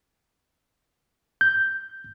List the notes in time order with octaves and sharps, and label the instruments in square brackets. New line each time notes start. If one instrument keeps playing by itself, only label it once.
[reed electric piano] G6